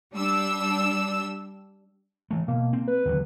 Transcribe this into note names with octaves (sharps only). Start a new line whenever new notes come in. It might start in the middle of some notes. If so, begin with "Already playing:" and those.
G3 D4 E6
E3 A3
B2 A#3
C4
B4
D#2 D3 F#3